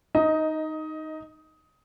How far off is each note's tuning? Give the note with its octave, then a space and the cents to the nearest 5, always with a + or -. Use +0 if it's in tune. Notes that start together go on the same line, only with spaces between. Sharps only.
D#4 +0 D#5 +15